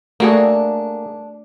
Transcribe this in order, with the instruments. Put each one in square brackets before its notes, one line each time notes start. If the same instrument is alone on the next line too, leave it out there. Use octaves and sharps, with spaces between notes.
[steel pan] A3 F#4 A4 [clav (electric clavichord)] A#3 G#4 [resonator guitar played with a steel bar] D4